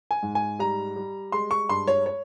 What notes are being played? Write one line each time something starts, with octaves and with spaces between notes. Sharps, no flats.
G#5
G#2
G#5
G3 A#5
G3
G#3 C6
C#6
G2 C6
C#5
C#5